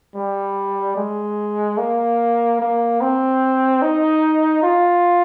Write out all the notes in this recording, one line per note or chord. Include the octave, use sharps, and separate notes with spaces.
G3
G#3
A#3
A#3
C4
D#4
F4